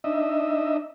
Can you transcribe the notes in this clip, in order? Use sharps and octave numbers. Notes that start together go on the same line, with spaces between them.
D4 D#4 D#5 E5